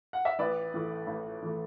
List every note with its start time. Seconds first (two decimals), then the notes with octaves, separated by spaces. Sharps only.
0.13 F#5
0.25 E5
0.39 A1 B4 D5
0.74 A2 E3 A3
1.07 A1
1.42 A2 E3 A3